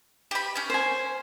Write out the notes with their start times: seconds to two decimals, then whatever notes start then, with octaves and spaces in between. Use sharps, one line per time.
0.31 G4 B5
0.55 C#4 G6
0.70 C5 G#5